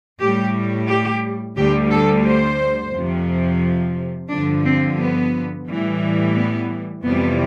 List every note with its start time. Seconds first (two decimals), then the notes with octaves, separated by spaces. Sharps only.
0.19 A2 G3 G4
0.88 G4
1.56 D2 D3 G3 G4
1.91 A4
2.26 C5
2.93 F2 C3 F3
4.31 G2 D3 F3 D4
4.65 C4
4.99 B3
5.68 A2 E3 G3
6.36 B3
7.04 F2 C3 E3 G3 B3